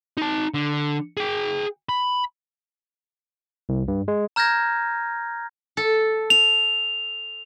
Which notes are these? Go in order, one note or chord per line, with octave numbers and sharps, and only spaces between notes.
D#4 A5
D3
G#4 G5
B5
C2
G2
G#3
A#5 F6 G6 G#6 A#6
A4
F7